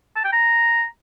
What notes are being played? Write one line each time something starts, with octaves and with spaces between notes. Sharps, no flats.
A5
G5
A#5